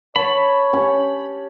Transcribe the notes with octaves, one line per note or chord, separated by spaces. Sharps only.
C#5 A5 B5
C#4 G4